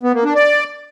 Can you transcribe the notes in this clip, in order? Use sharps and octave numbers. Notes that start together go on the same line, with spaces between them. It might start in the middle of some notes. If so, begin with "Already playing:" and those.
B3
A#3
D4
D5